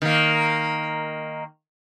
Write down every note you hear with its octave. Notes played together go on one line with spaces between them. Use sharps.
D#3 A#3